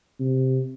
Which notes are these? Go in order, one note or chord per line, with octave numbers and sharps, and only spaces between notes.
C3